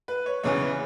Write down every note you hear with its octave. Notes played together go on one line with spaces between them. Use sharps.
B4
C#5
E2 C#3 E3 C#5